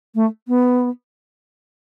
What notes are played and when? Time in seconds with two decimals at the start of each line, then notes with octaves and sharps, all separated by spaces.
0.15 A3
0.48 B3